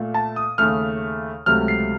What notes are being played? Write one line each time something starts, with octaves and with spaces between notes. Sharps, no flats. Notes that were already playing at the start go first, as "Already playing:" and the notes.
Already playing: A#2 A3
A5
D#6
D#2 C#3 A3 F6
C#2 C3 F#3 A3 F6
C7